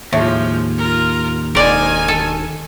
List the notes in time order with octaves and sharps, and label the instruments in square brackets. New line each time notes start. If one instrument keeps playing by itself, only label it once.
[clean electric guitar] D#2 [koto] A2 [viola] F3 G#3
[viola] F4 A#4
[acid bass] E1 [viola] D#3 G#5 [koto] A#4 D5
[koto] A4